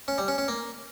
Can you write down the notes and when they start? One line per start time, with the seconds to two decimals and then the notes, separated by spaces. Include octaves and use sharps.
0.08 C#4
0.18 G3
0.28 C#4
0.38 C#4
0.48 A#3